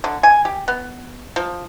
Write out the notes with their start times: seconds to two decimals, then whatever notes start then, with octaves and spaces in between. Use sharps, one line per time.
0.04 D3
0.23 G#5
0.45 G4
0.68 B3
1.36 F3